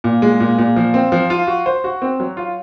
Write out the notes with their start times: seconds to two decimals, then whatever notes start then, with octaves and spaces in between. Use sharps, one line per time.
0.04 A#2
0.22 G#3
0.40 A#2
0.58 A#2
0.76 F3
0.94 C4
1.12 F3
1.30 F4
1.47 F#4
1.66 C5
1.84 F#4
2.02 C4
2.20 F#3
2.37 F4